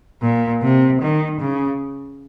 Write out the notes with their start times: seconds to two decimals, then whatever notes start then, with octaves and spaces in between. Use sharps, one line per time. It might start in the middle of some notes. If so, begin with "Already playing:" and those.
0.22 A#2
0.62 C3
1.01 D#3
1.40 C#3